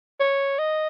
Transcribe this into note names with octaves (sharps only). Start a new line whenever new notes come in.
C#5
D#5